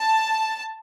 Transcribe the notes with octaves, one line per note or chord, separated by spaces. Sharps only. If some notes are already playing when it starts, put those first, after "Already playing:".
Already playing: A5